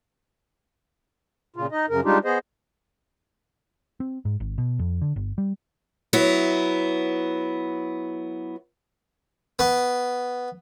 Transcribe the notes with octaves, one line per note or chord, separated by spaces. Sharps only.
A#2 C#3 F4
D#4 D#5
F#2 C#3 A#4
G3 G#3 D4 D#4 F4 G4
B3 G#4 C5 D#5
C4
G#2
G#1
B2
F2
D3
G1
G3
F#3 B3 E4
B3